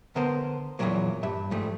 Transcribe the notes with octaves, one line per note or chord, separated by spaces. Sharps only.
D3 B3 A#4 C5
E2 A#2 D3 E3 F#3 A#3
G2 E5
G#2 F3 G3 A3